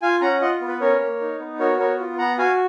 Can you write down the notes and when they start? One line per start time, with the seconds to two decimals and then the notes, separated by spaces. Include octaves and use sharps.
0.02 F4 F5 G#5
0.21 C#4 F#5 A#5
0.41 F4 D#5 F#5
0.61 B3
0.68 B4
0.81 C#4 A#4 C#5
1.01 A#3
1.21 D#4
1.40 B3
1.59 F#4 A#4 C#5
1.79 B3 A#4 C#5
1.99 F4
2.18 B3 F#5 A#5
2.38 F#4 F5 G#5